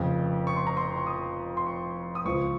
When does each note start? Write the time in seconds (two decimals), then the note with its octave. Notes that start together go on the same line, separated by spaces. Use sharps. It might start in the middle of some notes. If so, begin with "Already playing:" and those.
Already playing: F1 F2 C#3
0.47 C#6
0.56 C6
0.67 A#5
0.77 C6
0.98 C#6
1.06 D#6
1.57 C6
1.66 C#6
2.15 D#6
2.25 C#2 C#3 F3 C#6